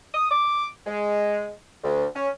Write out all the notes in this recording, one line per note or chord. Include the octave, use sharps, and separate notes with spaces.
D#6
D6
G#3
D2
C#4